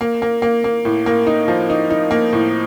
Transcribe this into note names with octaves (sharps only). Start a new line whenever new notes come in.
A#3
A#3
A#3
A#3
A2
A#3
D#4
F3
D#4
D#4
A#3
A2